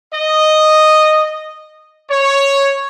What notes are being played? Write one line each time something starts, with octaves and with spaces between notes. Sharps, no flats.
D#5
C#5